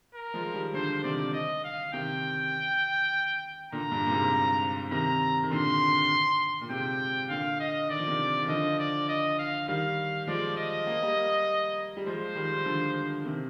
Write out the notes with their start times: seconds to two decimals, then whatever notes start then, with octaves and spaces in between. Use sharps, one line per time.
0.15 A#4
0.34 F3 G#3
0.54 D#3 G3
0.74 D3 F3 C5
1.03 C3 D#3 D5
1.33 D#5
1.64 F5
1.93 C3 D#3 G5
3.72 A#2 D3 A#5
3.91 G2 A#2
4.06 A#2
4.11 G#2 C3
4.91 C3 D#3 A#5
5.44 D#3
5.51 A#2 D3 C6
6.61 A#2
6.69 G#2 C3 G5
7.29 A#2 D3 F5
7.60 D#5
7.89 D#3 D5
7.99 F3
8.08 C3 D#3
8.43 D#3
8.48 D3 F3 D#5
8.79 D5
9.09 D#5
9.39 F5
9.68 D#3 G3 F5
10.27 F3 G#3 D5
10.57 D#5
10.87 A#3
11.02 G3 A#3
11.97 G3
12.06 F3 G#3 C5
12.36 D#3 G3
12.66 D3 F3
13.25 C3 D#3